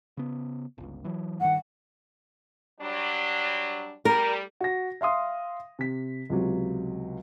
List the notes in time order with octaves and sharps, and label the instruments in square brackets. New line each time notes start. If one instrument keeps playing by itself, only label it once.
[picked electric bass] C#3 B3
G1 C#2
E3 F#3
[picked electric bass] G2 D#3 [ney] F#5
[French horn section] F#3 G3 D4
[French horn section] G3 [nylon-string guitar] A#4
[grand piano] F#4 A#6
E5 F5 C6 D#6
C3 B6
C#2 C3 F#3